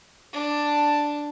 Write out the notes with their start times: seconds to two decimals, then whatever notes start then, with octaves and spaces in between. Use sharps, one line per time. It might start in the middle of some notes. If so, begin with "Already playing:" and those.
0.33 D4 A5